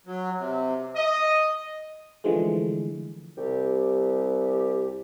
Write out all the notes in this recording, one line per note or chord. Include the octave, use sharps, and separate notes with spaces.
F#3
C3
D#5
D3 E3 F3 G#3 A3
C2 G4